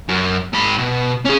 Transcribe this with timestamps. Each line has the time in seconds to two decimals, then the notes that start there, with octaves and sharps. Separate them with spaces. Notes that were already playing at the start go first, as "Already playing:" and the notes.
0.09 F#2
0.53 G#2 B5
0.79 B2
1.25 C#4 G#4